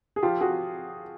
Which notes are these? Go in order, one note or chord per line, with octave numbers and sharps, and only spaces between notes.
G#4
F3 F4 G4
F3 F#4 G#4